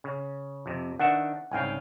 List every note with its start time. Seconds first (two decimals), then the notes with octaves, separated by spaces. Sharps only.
0.04 C#3
0.66 F2 C3
0.99 D#3 D4 E5 F#5
1.51 C2 G#2 C#3 F5 G5 G#5